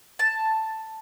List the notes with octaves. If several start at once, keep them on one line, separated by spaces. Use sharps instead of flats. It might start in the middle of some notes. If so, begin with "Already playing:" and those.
A5